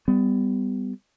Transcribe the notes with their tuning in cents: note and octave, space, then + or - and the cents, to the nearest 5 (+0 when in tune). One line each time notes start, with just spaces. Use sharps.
G3 +0 B3 +25